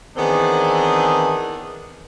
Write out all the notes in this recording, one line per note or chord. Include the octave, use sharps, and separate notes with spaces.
D#3 E3 B3 C4 D4 G#4